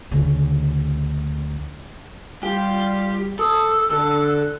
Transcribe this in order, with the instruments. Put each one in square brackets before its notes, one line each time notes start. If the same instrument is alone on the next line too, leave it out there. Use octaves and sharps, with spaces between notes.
[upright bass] D2 C#3
[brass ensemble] G3 [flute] F4 [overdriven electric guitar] G4
[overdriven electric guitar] A4 [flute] D#6 [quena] E6
[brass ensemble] D3 [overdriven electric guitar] A4 [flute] F#6